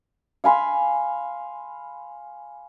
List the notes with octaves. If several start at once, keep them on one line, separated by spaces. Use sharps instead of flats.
F5 G#5 B5 C6